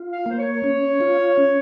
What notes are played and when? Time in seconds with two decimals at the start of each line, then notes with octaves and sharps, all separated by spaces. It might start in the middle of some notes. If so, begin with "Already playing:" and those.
Already playing: F4
0.13 F5
0.26 A#3 C5
0.39 C#5
0.64 C#4
1.01 F4
1.38 C#4